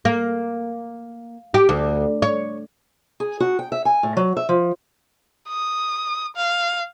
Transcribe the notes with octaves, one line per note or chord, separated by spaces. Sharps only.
A#3
G4
D2
C#5
G#4
F#4
G5
E5
G#5
A2
F#3
E5
F3
D#6
F5